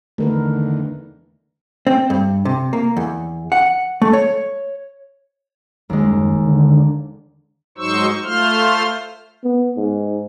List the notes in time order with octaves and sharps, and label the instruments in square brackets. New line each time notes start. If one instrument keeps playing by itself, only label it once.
[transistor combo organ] E2 D3 D#3 [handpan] A3 A#4 B4
[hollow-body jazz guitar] C4
G2
C3
A#3
E2
F#5
A3
C#5
[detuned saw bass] F#1 [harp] D#2 G#3
[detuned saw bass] D3
[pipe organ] G#2 F#3 D#4 C5 C#6 E6
A3 F4 C5 C6 F6
[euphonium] B3
G#2